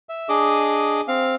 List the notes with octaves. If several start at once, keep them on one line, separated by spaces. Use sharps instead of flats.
E5
D4 G#4 D#5 D6
C4 F5